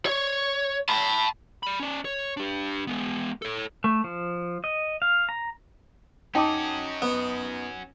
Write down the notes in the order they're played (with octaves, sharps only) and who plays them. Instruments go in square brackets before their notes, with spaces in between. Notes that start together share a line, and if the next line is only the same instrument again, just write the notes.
[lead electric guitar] C#5
A5 B5
D5 B5
C#4 D5
C#5
D4 G4
G#3 B3
A4 C#5
[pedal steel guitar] A3
F3
D#5
F5
A#5
[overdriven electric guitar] C#4 F#4 [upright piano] D#4 [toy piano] G5 A5 D6
[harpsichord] B3